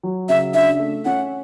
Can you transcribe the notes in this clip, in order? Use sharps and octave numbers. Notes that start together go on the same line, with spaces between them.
F#3
C#3 E5
D4 E5
A3
C#4 F#5